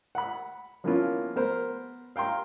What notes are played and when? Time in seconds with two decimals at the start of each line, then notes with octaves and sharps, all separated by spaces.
0.15 F#5 B5
0.84 F3 A#3 B3 C#4 E4 F4
1.36 B3 A#4 C5
2.16 F5 G5 A#5 C6